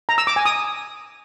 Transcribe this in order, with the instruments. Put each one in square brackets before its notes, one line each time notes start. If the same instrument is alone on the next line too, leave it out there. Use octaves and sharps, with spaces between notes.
[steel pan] A#5
E6
D6
G#5
D#6